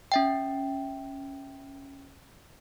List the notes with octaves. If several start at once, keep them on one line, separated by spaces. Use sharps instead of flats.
C#4 E5 G5